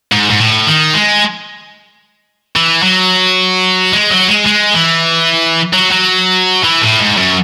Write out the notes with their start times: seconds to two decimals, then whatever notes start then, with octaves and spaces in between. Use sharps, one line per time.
0.12 G#2
0.30 G#2
0.40 A2
0.67 D#3
0.94 G#3
2.56 E3
2.83 F#3
3.93 G#3
4.10 F#3
4.28 G#3
4.46 G#3
4.74 E3
5.73 F#3
5.91 F#3
6.63 E3
6.82 A2
7.00 G#2
7.17 F#2